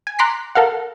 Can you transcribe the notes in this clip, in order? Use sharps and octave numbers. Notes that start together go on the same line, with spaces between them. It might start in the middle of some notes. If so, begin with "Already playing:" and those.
G#5
A#5 C6 D6 F#6 B6 C7
A4 A#4 F5 F#5